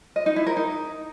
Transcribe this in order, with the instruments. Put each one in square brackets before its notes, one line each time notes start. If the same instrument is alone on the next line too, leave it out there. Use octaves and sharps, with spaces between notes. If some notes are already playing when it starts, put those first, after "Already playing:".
[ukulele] D#5
D#4
E4
A#4
D#4